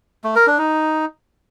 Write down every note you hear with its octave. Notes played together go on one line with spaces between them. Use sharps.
A3
A#4
D4
D#4